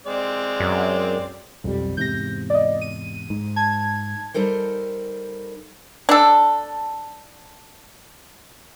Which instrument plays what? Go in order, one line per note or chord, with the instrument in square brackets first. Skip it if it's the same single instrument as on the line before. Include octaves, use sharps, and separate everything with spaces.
[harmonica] G#3 C4 D5
[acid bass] F#2
[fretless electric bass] B1 G3 [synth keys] F2
[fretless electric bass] E2 G#2 C3 [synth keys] G6 A#6
[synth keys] D5 D#5
D#7
[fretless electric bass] G#2
[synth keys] A5 G#6
[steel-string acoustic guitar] G3 D#4 A4 A#4 C5
[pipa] D4 A4